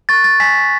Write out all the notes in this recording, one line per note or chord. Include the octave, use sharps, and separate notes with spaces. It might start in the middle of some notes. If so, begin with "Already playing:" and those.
C#6 F#6 A6
A6
G#5 B6